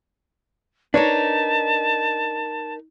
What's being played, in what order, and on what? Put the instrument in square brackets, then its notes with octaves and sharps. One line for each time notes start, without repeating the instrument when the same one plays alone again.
[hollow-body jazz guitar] D4 C#5 [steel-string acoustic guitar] D#4 A#4 B4 [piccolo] A5